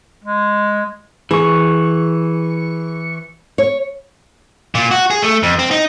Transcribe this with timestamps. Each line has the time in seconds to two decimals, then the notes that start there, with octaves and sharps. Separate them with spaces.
0.24 G#3
1.31 E3 G#4 C#6
3.58 C#5
4.75 A#2
4.91 F#4
5.11 G#4
5.22 A3
5.43 F2
5.59 C4
5.71 D#4